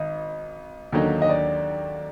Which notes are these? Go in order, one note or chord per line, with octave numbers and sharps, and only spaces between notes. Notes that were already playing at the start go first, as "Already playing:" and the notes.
Already playing: G#1 D#3 D#5
D#2 D3 F#3 A#3 D#4
D#5
D5